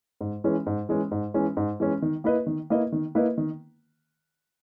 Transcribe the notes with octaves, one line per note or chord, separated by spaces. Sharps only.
G#2
E3 G#3 C#4
G#2
E3 G#3 C#4
G#2
E3 G#3 C#4
G#2
E3 G#3 C#4
D#3
A#3 E4 B4 D#5
D#3
A#3 E4 B4 D#5
D#3
A#3 E4 B4 D#5
D#3